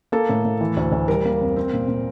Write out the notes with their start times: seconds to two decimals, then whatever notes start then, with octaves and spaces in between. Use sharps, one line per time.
0.12 A#3 A4
0.29 A2
0.45 A2
0.60 E3
0.77 D2
0.92 D2
1.08 G3 A#4
1.25 A#3
1.41 F2
1.56 C4
1.73 A#2
1.88 A#2